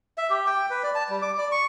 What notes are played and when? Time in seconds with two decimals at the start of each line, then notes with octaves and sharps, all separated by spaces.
0.18 E5
0.30 G4
0.46 G5
0.70 B4
0.83 D5
0.95 A5
1.09 G3
1.22 D6
1.38 D5
1.51 C#6